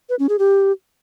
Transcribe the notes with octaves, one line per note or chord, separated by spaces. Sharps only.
B4
C#4
G#4
G4